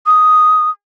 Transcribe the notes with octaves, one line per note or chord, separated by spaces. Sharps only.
D#6